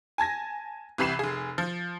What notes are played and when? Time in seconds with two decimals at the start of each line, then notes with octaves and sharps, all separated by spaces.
0.18 G#5 A5 G#6 A#6
0.98 C2 C3 E3 B5 C7 E7
1.19 F1 G#4
1.58 F3